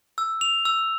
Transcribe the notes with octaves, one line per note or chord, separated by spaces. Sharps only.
E6
F7
E6